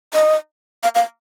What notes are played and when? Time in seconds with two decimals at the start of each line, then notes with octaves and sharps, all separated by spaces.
0.14 D#5
0.83 F5
0.95 F5